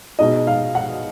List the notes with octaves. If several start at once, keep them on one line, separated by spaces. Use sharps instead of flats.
B2 G#3 D#4 D#5
F5
F#5